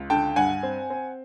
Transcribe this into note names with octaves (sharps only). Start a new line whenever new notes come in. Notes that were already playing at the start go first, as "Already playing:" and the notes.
Already playing: C#2
D3 G5 A5
G2 F#5 G#5
C4
C4